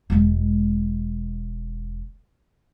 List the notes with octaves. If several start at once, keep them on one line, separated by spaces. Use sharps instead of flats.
E1 G#3